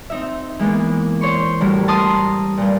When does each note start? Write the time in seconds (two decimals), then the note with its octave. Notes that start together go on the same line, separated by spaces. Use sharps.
0.10 C4 D#4 E5
0.59 E3 G#3 A#3 B3
1.21 C5 C#5 C6 C#6
1.61 D2 A2 G3 A#4
1.88 A5 A#5 C6 D#6 F6
2.57 G2 A#2